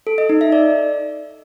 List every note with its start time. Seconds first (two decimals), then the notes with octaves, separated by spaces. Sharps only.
0.07 A4
0.18 D#5
0.29 D#4
0.41 E5
0.52 D5